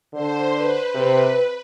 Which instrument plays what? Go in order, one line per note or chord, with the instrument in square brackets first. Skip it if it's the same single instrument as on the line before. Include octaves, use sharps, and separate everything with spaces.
[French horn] D3 [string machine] C5
[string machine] B4
[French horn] C3